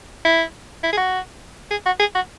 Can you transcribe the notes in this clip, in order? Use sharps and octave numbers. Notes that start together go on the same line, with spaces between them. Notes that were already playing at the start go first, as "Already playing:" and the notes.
E4
E4
G#4
F#4
G#4
F#4
G#4
F#4